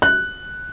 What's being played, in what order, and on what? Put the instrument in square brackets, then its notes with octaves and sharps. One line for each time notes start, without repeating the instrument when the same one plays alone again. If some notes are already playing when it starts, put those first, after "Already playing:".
[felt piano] F#6